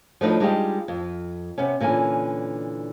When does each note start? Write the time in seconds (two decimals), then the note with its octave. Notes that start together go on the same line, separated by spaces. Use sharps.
0.21 F3 F#3 A3 D4 D#4 B4
0.40 G3 G#3 D4 D#4 F4 G4
0.88 F2
1.58 C3 B3 C#4
1.80 A#2 D3 E3 C#4 G#5